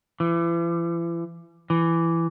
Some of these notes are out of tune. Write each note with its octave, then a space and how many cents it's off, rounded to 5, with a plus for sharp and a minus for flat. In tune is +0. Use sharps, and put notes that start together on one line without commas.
E3 +40
E3 +15